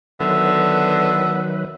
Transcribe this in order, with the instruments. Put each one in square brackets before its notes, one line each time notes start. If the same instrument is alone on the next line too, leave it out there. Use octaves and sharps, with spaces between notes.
[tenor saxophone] D3 [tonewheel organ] D#3 F#3 B4 [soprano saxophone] B3 [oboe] E5